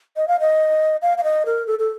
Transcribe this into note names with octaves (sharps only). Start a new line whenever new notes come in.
D#5
F5
D#5
F5
F5
D#5
A#4
A4
A4